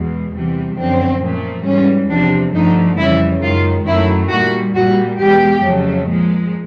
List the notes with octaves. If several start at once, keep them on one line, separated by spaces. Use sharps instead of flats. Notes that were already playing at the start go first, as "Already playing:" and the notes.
Already playing: E2 B2 G#3
E2 C3 E3 G3
F#2 D3 F3 C4
A#2 F3 A3
G#2 E3 G3 C#4
E2 C3 F3 D4
G2 D3 F3 A3 D#4
F2 C#3 E3 G3 E4
F#2 D#3 G#3 F4
F#2 D#3 F#3 A3 E4
A#2 G3 F#4
A#2 G3 F#4
E2 B2 G#3 G4
F2 C#3 F#3 A3
A#2 F3 G#3